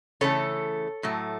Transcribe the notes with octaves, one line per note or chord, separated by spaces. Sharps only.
C#3 E3 A3 A4 C#5
A2 F#3 A3